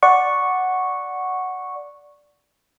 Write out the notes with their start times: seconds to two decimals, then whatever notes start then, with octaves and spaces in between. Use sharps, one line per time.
0.03 D5 F#5 C#6